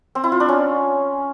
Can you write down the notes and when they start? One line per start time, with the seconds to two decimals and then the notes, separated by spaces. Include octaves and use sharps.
0.15 C4
0.24 E4
0.32 F4
0.40 D4
0.49 C#4